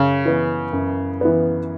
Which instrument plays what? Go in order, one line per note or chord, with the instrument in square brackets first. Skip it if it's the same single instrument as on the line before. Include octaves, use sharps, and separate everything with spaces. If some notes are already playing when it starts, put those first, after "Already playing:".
Already playing: [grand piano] F#2 [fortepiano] C#3
[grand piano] E3 B3
F#2
E3 B3